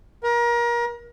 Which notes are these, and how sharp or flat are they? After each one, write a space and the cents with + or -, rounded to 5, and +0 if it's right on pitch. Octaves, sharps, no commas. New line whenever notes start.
A#4 +30